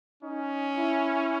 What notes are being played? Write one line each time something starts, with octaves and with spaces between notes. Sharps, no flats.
C#4 D#4
E4